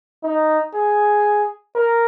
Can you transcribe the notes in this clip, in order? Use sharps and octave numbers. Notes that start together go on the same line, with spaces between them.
D#4
G#4
A#4